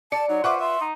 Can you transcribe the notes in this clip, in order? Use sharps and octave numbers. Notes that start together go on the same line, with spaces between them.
D5 A5 C#7
F#3 D#4
F4 B4 C5 E5 F#5 C#6 D6
E5 C6
D#4